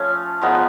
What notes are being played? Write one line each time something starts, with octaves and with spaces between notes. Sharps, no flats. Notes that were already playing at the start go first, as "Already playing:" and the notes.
Already playing: F3 A3 C#4 F4
F3 G#3 B3 D#4